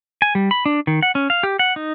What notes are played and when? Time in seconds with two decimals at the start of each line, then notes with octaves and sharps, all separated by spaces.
0.22 G#5
0.35 G3
0.51 B5
0.66 D4
0.87 D#3
1.03 F#5
1.15 C#4
1.30 F5
1.43 G4
1.59 F#5
1.76 D#4